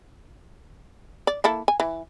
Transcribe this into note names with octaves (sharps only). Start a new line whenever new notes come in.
D5
A#3 E4 A4
G#5
E3